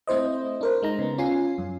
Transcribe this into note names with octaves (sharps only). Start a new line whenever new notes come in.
A3 C4 E4 C5 D#5
D4 A#4 C5
G#3 D#4 A#5
C#3 B3
C#4 F4 G#5 C7
F#2